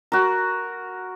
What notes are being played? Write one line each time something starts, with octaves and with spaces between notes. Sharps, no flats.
F#4 A#4